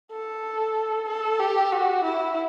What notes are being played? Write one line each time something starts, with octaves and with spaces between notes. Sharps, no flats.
A4
A4
G4
F#4
E4